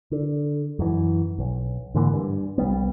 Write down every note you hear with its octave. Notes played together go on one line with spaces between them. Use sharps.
D3
F#2 E3
B1
G#2 D3 E3 A#3
G2
C2 G3 B3